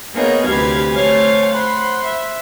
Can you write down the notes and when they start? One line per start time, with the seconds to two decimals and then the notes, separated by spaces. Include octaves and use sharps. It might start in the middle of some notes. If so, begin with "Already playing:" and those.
0.13 A#3 B3 D#4 G#4 A#4 C#5
0.46 D2 C3 G4 B4 F5 G#6
0.93 A3 C5 C#5 F5 G#5
1.53 C5 F#5 B5 C6
2.05 E5